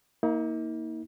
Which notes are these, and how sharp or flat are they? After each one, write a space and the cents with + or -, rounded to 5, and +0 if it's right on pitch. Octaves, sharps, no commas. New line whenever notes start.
A#3 +0 D#4 +45